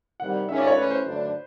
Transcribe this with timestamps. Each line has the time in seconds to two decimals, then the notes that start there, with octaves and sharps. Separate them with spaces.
0.20 C3 D#3 G3 F#5
0.48 D#3 G#3 C#4 F4 E5
0.58 D5
0.67 C#5
0.76 E3 A3 C#4 B4
0.90 C5
1.05 D3 F#3 A3 D4